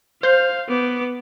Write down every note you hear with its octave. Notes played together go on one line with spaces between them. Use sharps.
C5 F5 G6
B3 D6